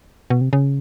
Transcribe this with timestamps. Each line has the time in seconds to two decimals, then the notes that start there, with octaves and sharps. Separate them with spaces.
0.30 B2
0.41 C3
0.53 C#3